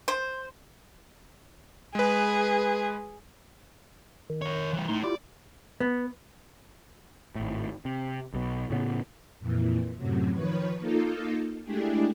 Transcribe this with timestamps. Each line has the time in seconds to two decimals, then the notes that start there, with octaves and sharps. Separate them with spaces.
0.08 C5
1.95 G#3 G#4 B4
4.30 D#3
4.42 A#4 C#5
4.73 E3 G3
4.88 A2 D#4 C6
5.04 E4 F4 G4 D5
5.80 B3
7.35 G#1 A2
7.85 C3
8.34 B1 B2
8.70 A2 C#3 B3
9.40 F2 A#2 E3
9.96 F#2 A2 C3 F#3
10.33 D#3 F3 B4 C#5
10.79 A#3 D#4 F4 A4
11.64 G#3 A3 D4 E4 G4 G#4